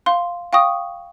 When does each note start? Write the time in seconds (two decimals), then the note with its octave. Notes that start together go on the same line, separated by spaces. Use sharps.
0.06 F5 C6
0.53 F5 G5 C#6 D#6